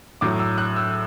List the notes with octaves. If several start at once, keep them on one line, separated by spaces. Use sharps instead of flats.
A2 F#3 D6
E6
F#6
E6